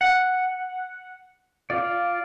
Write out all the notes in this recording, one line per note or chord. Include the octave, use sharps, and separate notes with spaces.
F#5
F4 D5